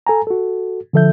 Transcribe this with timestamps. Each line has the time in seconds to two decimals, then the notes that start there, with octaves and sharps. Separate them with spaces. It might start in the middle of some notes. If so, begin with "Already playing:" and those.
0.07 A4 G#5 A#5
0.27 F#4 A4
0.93 D3 F3 A4 E5 G6